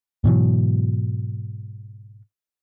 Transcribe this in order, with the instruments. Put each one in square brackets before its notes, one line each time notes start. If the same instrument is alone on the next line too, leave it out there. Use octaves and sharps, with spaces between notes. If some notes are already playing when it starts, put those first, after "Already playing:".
[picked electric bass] G#2 B2 E3 F#3